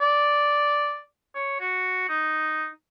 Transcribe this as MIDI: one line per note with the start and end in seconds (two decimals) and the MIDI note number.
0.01 1.00 74
1.35 1.60 73
1.60 2.04 66
2.09 2.68 63